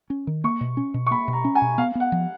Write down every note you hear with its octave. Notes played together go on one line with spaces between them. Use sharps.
C#4
D#3
A#3 C#6
B2
C#4
B2
C#6
A#3 B5
B2
A#5
C#4
G#5
B2
B3 F5
B3 F#5
F3